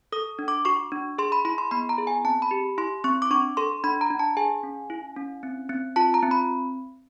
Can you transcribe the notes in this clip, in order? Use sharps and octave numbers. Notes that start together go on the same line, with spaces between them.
A4 D#6
D4
D6
F#4 C#6
D4
G#4 C6
B5
E4 B5
C6
B3 B5
A#5
G#4
G#5
C4 A5
B5
G4
E4 C6
C4 C#6
D6
D4 C#6
A4 C6
D4 B5
A#5
D4
A5
G#4 G#5
C#4
E4
C#4
C4
C4
F4 A5
A#5
C4
B5